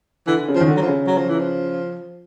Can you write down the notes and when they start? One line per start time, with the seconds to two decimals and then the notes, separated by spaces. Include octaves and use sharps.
0.27 D3 E3
0.48 C#3
0.55 F3
0.60 D#3
0.68 D3
0.77 F#3
0.82 F3
0.87 C#3
1.07 F#3
1.18 F3
1.29 E3
1.40 F3